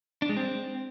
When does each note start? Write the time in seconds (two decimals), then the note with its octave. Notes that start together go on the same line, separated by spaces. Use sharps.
0.22 D4
0.29 G#3
0.37 C4